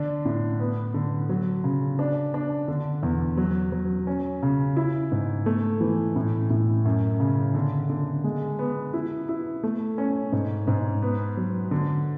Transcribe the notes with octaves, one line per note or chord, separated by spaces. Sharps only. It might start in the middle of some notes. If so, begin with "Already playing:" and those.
Already playing: D3 D4
A2
B3
D3
F#3
C#3
D4
D4
D3
E2
F#3
F#3
C#4
C#3
E4
G#2
A3
E3
A2
A2
F#2
C#3
D3
D3
G#3
B3
E4
E4
A3
C#4
G#2
G#2
B3
F#3
D3